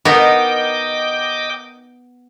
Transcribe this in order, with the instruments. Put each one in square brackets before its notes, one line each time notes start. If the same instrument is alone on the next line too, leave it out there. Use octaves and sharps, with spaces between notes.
[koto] B3 [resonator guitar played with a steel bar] D#4 A#4 [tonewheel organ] D#5 G5 D6